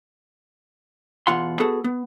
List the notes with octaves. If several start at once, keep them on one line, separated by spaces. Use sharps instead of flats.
E2 B2 F4 F#5 C6
B3 F#4 G#4 A4
B3